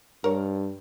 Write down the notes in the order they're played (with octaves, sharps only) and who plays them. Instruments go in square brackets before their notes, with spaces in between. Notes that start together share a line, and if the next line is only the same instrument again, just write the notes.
[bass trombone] G2 [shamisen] A#4 C#5